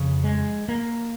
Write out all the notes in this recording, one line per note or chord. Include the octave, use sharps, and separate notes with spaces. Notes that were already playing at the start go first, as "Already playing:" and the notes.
Already playing: F2 C#3
G#3
A#3